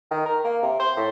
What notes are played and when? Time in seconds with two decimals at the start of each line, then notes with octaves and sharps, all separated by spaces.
0.11 D#3
0.25 A#4
0.45 A#3
0.62 C3
0.79 C5
0.97 A2